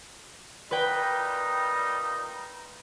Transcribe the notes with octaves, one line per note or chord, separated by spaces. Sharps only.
A#2 G3 D#4 B4 G5